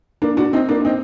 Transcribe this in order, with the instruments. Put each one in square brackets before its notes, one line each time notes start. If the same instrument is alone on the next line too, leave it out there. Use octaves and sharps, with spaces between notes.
[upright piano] A#3 D4
D4 F#4
C4 D#4
A#3 D4
C4 D#4